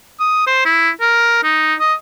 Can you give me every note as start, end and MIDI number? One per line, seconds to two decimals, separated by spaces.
0.20 0.46 87
0.47 0.64 72
0.65 0.90 64
1.01 1.40 70
1.43 1.74 63
1.80 1.94 75